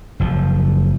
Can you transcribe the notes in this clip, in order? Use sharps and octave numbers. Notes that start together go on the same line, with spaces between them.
F#1 F3